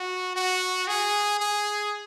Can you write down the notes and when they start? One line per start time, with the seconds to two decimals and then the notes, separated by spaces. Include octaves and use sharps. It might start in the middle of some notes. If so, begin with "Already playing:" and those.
Already playing: F#4
0.36 F#4
0.88 G#4
1.40 G#4